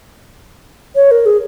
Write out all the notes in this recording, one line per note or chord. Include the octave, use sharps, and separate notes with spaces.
C#5
A#4
G#4